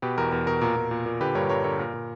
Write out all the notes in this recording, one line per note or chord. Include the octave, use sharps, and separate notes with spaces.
B2 G4 B4
E2 A#4
E2 A#4
B2 A#4
A#2 A#4
A#2
A#2
A#2
D3 G4 B4
G2 A#4 C#5
G2 A#4 C#5
D3 A#4 C#5
A#2 A#4
A#2